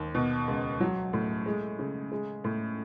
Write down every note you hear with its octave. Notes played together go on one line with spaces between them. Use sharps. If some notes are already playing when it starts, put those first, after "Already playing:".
Already playing: D#2
B2
C#2
F#3
A2
G#3
C#3
G#3
A2